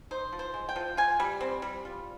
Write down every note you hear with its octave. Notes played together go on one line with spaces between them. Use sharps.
D#4 C5
F3
C5
G#3
G5
F3
F4 G#5
G3
C4
G3
F4